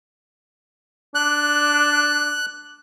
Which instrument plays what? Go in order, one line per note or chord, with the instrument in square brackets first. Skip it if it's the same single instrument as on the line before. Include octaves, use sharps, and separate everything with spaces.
[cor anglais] D4 [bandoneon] F#6